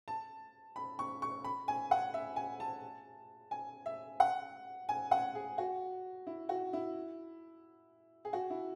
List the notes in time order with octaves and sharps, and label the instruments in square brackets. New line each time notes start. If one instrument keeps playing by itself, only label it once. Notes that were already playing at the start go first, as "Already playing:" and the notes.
[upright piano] A5
B5
C#6
C#6
B5
G#5
F#5
E5
G#5
A5
G#5
E5
F#5
G#5
F#5
G#4
F#4
E4
F#4
E4
G#4
F#4
E4